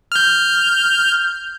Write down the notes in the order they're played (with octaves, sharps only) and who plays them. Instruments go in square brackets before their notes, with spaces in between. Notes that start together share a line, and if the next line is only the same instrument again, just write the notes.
[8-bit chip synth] F6 G6